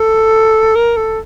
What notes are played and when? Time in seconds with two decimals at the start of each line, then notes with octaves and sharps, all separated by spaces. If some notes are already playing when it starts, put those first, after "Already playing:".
Already playing: A4
0.75 A#4
0.97 A4